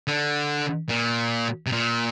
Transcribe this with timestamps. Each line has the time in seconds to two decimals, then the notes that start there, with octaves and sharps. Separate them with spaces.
0.08 D3
0.89 A#2
1.67 C3
1.72 A#2